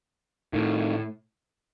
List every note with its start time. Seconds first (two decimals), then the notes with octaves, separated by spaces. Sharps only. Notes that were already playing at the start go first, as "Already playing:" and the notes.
0.53 A2 D#3